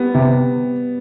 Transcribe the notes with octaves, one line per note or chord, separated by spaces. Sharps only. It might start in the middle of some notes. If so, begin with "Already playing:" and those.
Already playing: G3 B3
C3